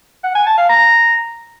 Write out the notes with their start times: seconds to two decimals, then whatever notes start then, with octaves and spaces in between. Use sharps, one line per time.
0.24 F#5
0.35 G#5
0.46 A5
0.58 F5
0.69 A#5